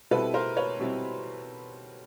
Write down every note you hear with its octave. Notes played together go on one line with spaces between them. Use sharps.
B2 G3 C4 E4 A4 B4
A#4 C5
B4 C#5
B2 G3 C4 E4